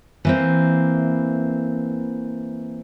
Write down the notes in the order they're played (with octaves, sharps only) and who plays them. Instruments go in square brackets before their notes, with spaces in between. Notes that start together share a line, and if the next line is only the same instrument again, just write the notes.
[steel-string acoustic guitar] E3 A#3 C4